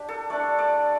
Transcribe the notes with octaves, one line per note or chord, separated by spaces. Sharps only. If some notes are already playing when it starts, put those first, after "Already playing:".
Already playing: D4 G4
A4
A3 D4 D5
D5